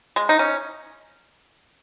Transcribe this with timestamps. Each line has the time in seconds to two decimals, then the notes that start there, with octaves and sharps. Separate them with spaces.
0.16 G#3
0.29 D#4
0.39 C#4